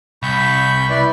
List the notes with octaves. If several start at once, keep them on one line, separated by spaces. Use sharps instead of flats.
C2 B5 C#6 G6
E4 B4 D5